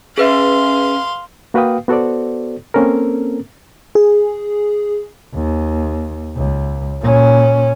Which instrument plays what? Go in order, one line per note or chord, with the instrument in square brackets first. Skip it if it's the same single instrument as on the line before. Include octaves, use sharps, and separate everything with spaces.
[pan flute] C#4 [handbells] G#4 B4 E5 [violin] F5 C6
[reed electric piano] A#3 F#4 B4 F5 G5 D#6
B3 F#4 A4 C5 D5
A#3 C4 C#4 A4 A#4
[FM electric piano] G#4
[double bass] D#2
C#2
A#2 C#4